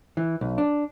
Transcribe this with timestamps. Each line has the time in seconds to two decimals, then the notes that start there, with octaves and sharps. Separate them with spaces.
0.17 E3
0.41 B1
0.58 D4